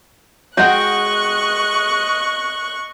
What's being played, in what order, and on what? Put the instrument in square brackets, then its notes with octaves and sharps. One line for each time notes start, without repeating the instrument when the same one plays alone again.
[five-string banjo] G#3 F#4 [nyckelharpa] D#5 [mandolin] F#5 G5 [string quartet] C#6 F#6